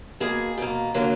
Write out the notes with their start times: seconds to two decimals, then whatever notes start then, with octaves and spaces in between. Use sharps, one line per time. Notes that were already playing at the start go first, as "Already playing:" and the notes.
0.20 B2 A#3 G#4
0.58 B2 A#3
0.94 D3 F#3 A#3